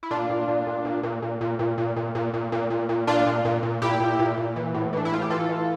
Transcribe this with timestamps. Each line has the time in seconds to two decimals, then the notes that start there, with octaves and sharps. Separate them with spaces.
0.03 E4
0.11 A#2 D4 F4
0.30 A#2
0.48 A#2
0.67 A#2
0.85 A#2
1.03 A#2
1.22 A#2
1.41 A#2
1.59 A#2
1.78 A#2
1.96 A#2
2.15 A#2
2.34 A#2
2.52 A#2
2.70 A#2
2.89 A#2
3.07 A#2 D4 F4
3.26 A#2
3.45 A#2
3.63 A#2
3.82 A#2 E4 G4
4.00 A#2
4.19 A#2
4.38 A#2
4.56 E3
4.74 A2
4.93 E3 D4
5.05 E4
5.12 A2 F4
5.22 G4
5.30 E3 F4 A4
5.49 E3